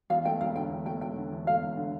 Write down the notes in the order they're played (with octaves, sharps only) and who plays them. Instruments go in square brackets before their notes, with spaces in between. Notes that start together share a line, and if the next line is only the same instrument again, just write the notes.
[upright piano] E2 [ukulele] F5
[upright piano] A3 [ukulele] G5
[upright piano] E1 [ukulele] F5
[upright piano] D3 [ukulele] G5
[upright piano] E2
[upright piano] A3 [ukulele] G5
[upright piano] E1 [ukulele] G5
[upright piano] D3
E2
[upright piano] A3 [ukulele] F5
[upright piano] E1
D3